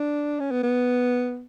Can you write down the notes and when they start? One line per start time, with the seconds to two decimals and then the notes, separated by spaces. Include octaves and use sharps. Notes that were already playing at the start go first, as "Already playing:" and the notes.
Already playing: D4
0.40 C#4
0.51 B3
0.63 B3